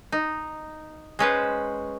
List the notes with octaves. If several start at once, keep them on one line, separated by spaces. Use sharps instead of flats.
D#4
G#3 C#4 B4 C5